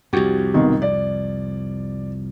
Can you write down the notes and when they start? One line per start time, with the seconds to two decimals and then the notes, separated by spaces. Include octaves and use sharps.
0.13 C2 F2 F#4 G4
0.54 G#1 B2 D#3
0.82 D5